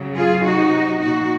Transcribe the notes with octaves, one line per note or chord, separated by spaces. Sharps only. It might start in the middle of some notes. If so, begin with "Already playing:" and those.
Already playing: C#3 F#3
F4 G#4
C3 F#3 D#4 F#4
A#2 F3 D#4 F#4